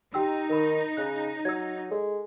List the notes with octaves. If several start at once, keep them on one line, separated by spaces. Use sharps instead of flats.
D#4 G4 G5 E6
D#3 A#4 B5
C#3 F#6
F#3 E6 G#6
G#3 A4